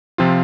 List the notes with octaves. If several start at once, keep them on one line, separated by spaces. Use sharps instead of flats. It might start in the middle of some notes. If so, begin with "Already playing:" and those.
C3 F3 C4 F4